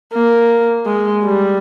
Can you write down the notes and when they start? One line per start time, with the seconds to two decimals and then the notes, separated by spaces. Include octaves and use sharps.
0.13 A#3
0.86 G#3
1.24 G3